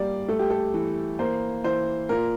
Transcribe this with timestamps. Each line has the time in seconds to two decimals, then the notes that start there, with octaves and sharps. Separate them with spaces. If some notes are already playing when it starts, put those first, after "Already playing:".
Already playing: G3 A#3 D5
0.28 A3 A4
0.39 G4
0.50 A4
0.74 E3
1.19 A#3 C5
1.64 E3 C5
2.09 A#2 A#4